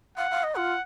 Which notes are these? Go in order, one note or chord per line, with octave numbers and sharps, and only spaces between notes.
F5 F#5
F5
D#5
F4 F#5